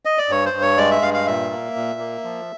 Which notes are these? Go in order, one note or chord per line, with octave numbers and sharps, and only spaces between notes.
D#5
D5
G2 C#5
C5
G2
C#5
G#3 D5
E5
G2 F5
F5
A#2 E5
A#3
A#2
A#3
F3